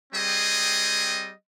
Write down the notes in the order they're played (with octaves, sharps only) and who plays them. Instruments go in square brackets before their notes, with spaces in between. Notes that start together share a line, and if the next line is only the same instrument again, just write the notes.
[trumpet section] G3 C4 G#4 D#5